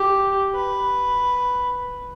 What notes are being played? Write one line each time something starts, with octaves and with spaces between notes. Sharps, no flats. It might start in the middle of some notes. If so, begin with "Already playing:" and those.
Already playing: G4
B4